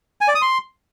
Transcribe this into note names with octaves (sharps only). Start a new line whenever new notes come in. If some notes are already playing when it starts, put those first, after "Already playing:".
G#5
D5
D#6
C6